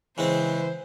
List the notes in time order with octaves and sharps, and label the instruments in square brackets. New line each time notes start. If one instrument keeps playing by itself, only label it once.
[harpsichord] C#3 G#3 C4 [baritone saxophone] E3 [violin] C5